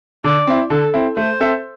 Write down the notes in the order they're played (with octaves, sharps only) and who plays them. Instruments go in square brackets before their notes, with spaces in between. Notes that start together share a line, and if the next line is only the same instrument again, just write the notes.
[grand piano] D3 [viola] D5
[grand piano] C4 E4
[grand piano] D3 [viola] A4
[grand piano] C4 E4
[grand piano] A3 [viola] C5
[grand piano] C4 A4 E5